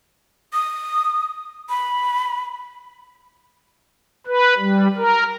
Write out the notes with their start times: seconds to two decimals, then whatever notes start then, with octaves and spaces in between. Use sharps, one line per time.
0.53 D#6
1.69 B5
4.27 B4
4.58 G3
4.97 A#4